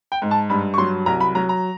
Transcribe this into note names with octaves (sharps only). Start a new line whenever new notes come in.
G5
G#2
A5
G2 B5
C#6
F#3 C6
C2 A#5
B5
F#3 A#5
A#5